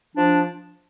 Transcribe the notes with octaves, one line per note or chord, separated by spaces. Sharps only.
F3 D4